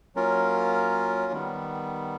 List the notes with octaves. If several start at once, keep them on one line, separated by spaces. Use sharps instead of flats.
F#3 A#3 C#4 F4 A#4
D#3 G3 B3